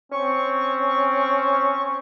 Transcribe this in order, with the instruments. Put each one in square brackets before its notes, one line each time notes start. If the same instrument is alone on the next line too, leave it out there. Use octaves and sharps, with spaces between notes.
[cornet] C4 [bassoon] C#4 [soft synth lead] C#6